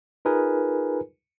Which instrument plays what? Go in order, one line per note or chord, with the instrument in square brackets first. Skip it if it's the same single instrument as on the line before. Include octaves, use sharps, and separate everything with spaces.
[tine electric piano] D#4 F4 G#4 A#4 B4 G#5